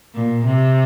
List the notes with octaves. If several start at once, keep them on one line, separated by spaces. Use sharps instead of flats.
A#2
C3